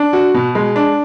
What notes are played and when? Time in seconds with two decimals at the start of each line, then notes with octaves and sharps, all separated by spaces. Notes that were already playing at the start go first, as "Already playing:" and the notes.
Already playing: D4
0.13 F#4
0.34 B2
0.55 G#3
0.76 D4